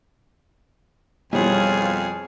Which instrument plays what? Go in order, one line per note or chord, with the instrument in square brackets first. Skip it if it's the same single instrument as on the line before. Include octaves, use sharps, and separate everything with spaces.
[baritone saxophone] F2 [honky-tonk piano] B2 E3 G3 [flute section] F4 C#5 [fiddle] G#4